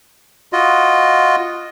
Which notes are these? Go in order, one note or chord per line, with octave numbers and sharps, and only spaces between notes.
F4 F#4 D#5